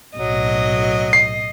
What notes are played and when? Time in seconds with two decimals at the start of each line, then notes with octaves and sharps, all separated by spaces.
0.17 B1 A2 F#3 D#5
1.13 C7